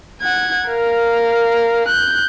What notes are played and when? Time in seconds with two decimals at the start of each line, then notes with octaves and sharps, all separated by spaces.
0.21 F#5 G#6
0.68 A#4 F5
1.88 F#6 G6